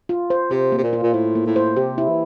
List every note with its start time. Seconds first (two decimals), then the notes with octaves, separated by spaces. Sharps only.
0.09 F4
0.30 C5
0.51 C3 C5
0.72 A#3
0.78 C3
0.83 A#2
0.93 F4
1.03 A#2
1.13 A2 C5
1.35 A#3
1.46 A2
1.56 C5
1.76 C3 G4
1.98 E4
2.09 E3